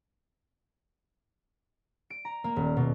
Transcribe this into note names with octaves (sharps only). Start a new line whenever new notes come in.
D7
A#5
A#3
D#1
B2